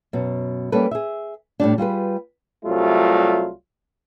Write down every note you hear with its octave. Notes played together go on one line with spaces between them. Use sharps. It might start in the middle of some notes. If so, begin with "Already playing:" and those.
F#2 B2
G3 A#3 C#4 A4 B4
G#4 E5
A2 G3 D4
G3 F4 G#4 B4
C2 F#3 G3 A3 F4